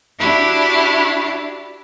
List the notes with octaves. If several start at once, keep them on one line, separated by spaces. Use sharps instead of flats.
D4 E4 F#4 G4 B5